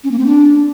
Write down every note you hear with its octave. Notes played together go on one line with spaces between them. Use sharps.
C#4
A#3
C4
D4